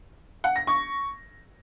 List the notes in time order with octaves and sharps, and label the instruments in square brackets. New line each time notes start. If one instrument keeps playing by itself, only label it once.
[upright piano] F#5
A#6
C#6